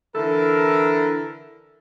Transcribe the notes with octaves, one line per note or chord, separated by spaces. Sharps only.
D3 E3 E4 A4 A#4